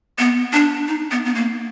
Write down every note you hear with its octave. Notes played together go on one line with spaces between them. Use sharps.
B3
D4
D#4
B3
B3
A#3